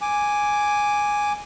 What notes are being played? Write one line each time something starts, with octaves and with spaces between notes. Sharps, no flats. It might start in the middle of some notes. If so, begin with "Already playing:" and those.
G#5 D6